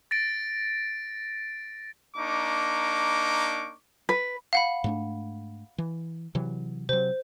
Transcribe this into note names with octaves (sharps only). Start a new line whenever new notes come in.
A6 A#6 D7
A#3 D4 D#4 C#6 D6
B4
F5 F#5 B5
G#2 A3 D4
E3
C3 E3 F#3
C3 F#3 C5